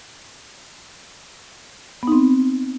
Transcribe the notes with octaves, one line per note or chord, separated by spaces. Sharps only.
B3 C4 D#4